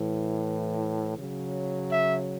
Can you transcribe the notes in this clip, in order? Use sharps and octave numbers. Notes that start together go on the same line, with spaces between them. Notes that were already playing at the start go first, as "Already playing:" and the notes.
Already playing: A2 E3
C#3 F#3
E5